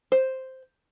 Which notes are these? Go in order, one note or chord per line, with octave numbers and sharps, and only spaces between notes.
C5